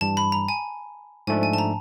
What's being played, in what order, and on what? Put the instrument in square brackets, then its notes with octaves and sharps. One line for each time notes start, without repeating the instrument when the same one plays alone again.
[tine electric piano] G2 E3 G3 [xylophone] A5
[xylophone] B5
A#5
G#5
[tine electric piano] G#2 F3 A3 D4 [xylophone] G#5
[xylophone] G#5
A5
A#5